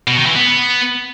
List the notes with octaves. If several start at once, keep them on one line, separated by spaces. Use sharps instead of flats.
B2
D#3
E3
B3